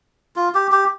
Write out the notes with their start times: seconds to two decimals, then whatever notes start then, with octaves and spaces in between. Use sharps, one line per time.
0.36 F4
0.55 G4
0.72 G4